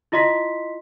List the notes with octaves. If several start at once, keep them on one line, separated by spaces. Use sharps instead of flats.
E4 F4 D#5 C6 B6